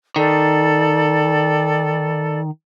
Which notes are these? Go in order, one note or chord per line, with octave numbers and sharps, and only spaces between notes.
D#3 A4 D5